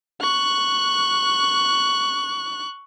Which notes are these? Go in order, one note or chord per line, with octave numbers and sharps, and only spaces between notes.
C#6 F#6